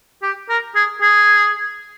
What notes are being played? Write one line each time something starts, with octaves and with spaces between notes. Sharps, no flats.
G4
A#4
G#4
G#4